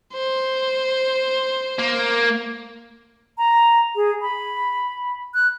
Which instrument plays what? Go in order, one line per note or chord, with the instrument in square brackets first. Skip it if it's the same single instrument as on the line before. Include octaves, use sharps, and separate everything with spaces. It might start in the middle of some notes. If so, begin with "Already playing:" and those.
[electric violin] C5
[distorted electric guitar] A#3
[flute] A#5
G#4
B5
F#6